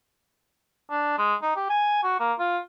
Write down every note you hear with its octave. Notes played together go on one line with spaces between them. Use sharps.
D4
G#3
D#4
G4
G#5
F#4
A#3
F4